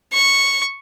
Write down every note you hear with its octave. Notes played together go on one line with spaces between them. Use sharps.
C#6